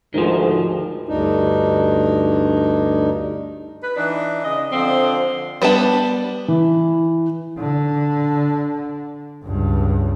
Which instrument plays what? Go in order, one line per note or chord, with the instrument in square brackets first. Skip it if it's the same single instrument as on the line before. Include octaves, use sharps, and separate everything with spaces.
[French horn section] D2 G#2 [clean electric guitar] D#3 F3
[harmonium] D2 G2 D4 D#4
[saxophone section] B4
E3 D4 D#4
C#3 D#5
D3 F3 C4
[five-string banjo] G3 B3 D4 A5
[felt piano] E3
[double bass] D3
C#2 G2